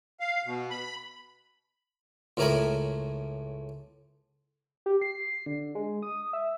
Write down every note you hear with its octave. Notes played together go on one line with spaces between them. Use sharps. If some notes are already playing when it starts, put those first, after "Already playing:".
F5
B2
B5
C#2 A2 A3 A#4 G#5 B5
G4
C7
D3
G#3
D#6
E5